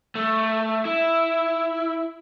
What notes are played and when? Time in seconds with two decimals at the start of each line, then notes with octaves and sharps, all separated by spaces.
0.15 A3
0.85 E4